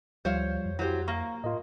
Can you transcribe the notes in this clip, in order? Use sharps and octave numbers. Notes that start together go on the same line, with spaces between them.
D2 F3 G3 F4 C5 C#5 F5
F2
F#3 E4 G4 C5
A#3 F5 C#6
A2 F4 A#4 D#5